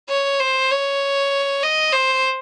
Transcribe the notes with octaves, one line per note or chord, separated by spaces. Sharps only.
C#5
C5
C#5
D#5
C5